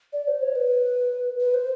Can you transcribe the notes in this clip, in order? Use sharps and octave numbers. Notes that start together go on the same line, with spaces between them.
D5
C5
C#5
B4
B4
C5